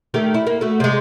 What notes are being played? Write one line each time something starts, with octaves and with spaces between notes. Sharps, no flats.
D#3 A3 G4
E4
A#3
A3 F#4
C3 G#3